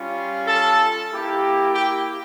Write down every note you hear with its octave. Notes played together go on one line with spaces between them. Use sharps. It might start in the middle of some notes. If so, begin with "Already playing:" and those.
Already playing: G3 C#4 F4
A4 A5
A#3 E4 G4
G4 G5